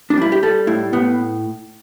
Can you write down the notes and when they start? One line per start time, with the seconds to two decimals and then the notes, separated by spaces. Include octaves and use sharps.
0.10 D4
0.17 G3 E4
0.32 G4
0.43 G3 A4
0.67 A2 E4
0.93 A2 B3